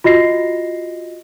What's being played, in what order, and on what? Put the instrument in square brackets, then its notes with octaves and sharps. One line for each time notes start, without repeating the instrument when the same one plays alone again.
[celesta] F4 F#4 D#5 A#6 C7